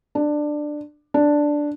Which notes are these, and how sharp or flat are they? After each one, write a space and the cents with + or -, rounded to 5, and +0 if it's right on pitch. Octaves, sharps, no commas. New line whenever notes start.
D4 +15
D4 +0